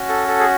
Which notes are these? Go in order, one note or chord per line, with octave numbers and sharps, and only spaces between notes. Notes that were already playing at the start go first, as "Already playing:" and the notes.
Already playing: C#4 F#4
A4
A4
G#4